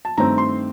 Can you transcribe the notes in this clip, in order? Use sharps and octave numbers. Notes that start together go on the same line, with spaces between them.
A5
G2 D#3 A3 C4 A#5
C6